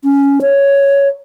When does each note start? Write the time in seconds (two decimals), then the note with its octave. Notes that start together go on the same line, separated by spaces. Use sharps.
0.04 C#4
0.41 C#5